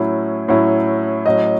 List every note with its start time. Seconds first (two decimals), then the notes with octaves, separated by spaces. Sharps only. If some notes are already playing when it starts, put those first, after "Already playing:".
Already playing: A2 F#3 C#4 E4
0.48 A2 F#3 C#4 E4
1.26 A2 F#3 C#4 D#5